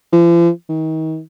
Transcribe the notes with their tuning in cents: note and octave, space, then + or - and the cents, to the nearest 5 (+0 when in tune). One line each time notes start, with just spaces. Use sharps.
F3 -45
D#3 +35